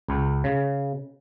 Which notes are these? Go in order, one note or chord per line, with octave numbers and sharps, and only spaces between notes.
C#2
C#3